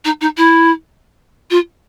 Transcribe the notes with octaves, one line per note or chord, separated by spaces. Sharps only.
D#4
D#4
E4
F4